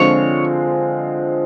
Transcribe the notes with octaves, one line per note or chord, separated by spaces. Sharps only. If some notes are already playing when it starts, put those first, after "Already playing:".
Already playing: D3 F3 G#3 C4 F4 C#5